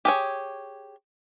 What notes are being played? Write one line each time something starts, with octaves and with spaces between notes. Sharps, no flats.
G4 G#4 C#5